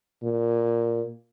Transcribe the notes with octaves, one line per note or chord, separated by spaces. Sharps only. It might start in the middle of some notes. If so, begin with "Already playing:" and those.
A#2